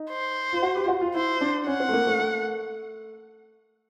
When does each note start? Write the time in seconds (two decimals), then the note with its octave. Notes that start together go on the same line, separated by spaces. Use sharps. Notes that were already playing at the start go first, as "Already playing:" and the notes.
Already playing: D#4
0.10 C5
0.53 F4
0.63 F#4
0.75 G4
0.85 F4
0.88 F#4
1.01 F4
1.14 E4 C5
1.41 D4
1.67 C#4 F#5
1.80 C4
1.89 A3
1.93 A#3
2.07 A3
2.19 A3